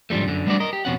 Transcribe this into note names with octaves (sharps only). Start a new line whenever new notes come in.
G#2 D3 F3 G3 A3
F#2 D3
G3 A3 B3 D4 F#4 D5
A#4 D#5
G4
F2 B2 C#4 F#5